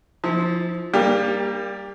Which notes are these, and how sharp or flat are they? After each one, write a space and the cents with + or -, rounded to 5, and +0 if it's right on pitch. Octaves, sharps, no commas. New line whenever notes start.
F3 +0 E4 -30
G3 +0 A#3 +0 G4 +30